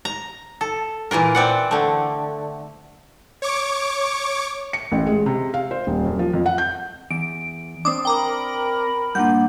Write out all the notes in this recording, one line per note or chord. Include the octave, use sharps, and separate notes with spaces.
A#5
A4
A#2 E3 F4 A#4
C4 D5 F#5
D3 A3
C#5 C#6 D6
C#7
A1
G#3
C3
F5
C5
D#1
F#2
F3
F2
F#5
G6
E2 D7
C4 D4 D6 D#6
A#4 G5 A#5 B5 D6
G2 A#2 A#3 D4 F#5 G6